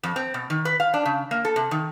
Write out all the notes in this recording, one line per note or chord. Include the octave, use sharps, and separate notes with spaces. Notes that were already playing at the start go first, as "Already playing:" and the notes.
F2
C4
B2
D#3
B4
F5
D4
C#3
A#3
A4
C3
D#3